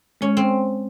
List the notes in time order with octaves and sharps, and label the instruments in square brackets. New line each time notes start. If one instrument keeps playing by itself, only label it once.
[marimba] G#3 [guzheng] C#4
[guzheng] C4